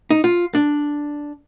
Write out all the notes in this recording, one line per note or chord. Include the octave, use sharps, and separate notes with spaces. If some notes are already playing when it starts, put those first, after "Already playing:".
D#4
F4
D4